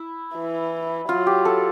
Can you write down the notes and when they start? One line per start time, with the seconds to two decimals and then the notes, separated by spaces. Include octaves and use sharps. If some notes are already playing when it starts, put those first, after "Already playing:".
Already playing: E4
0.35 E3
1.09 F#3 F4
1.27 G4
1.45 A4